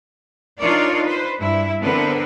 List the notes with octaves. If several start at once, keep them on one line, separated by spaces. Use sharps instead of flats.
D4 D#4 F4 A#4 C#5 D5
B4 C5
G2 E4
D3 B3 C4 A#4 B4